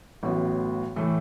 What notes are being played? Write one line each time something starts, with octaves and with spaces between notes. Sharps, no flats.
A1 A2 F#3 B3
A2 E3 A3